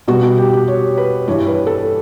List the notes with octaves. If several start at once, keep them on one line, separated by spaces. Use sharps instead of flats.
B2 G3 F#4
F#4
G4
G4
C#5
B4
G2 E3 G3 C#5
B4
A4